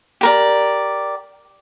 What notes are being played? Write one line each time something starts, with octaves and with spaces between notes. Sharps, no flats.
G4 A#4 D5